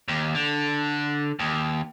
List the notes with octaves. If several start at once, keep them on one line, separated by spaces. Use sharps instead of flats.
D#2
D3
D#2